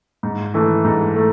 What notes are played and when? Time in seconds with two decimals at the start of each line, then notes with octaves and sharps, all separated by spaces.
0.23 G#2
0.54 E3 A3
0.84 G#2
1.16 A3